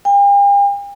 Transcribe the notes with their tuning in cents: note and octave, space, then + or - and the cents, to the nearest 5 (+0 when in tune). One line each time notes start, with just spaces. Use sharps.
G5 +45